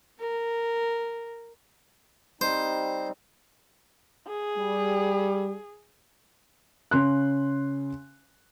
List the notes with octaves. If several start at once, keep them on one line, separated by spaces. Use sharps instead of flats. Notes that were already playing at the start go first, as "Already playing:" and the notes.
A#4
G3 C4 D#4 C5
G#4
G3
C#3 C6 F#6